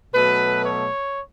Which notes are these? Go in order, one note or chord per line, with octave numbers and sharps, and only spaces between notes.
B2 F#3 A3 B4
C#5